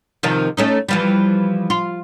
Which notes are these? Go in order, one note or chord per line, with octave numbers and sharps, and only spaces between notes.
C3 D#3 F3
A3 C#4 D#4
E3 F3 G3
F4